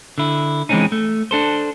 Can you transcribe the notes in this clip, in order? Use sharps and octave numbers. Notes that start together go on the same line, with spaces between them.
D3 E4
E3 G#3 A#3 C4 C#4 D#4
A3
D4 A4 C5